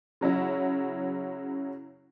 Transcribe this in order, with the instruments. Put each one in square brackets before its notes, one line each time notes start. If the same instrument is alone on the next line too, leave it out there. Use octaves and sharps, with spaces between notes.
[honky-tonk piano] C#3 F#3 C#4 E4